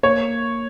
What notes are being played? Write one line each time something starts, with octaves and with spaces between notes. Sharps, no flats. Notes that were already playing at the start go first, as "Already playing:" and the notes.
A#3 C#5